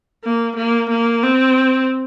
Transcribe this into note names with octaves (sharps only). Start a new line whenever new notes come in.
A#3
A#3
A#3
C4